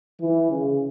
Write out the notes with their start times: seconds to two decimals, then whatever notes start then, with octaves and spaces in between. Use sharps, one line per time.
0.21 E3
0.51 C#3